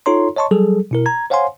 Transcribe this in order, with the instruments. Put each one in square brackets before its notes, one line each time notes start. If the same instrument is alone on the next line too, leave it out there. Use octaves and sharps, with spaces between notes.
[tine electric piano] D#4 F4 A4 C#5 A#5 C6
C#5 D#5 A5 C6 C#6
F#3 G3 G#4 A4
B2 E4 A#4
A#5 G#6
C5 C#5 F5 F#5 G#5 C6